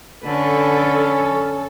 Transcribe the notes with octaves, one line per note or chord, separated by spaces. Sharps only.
D3 C#4 A4 B4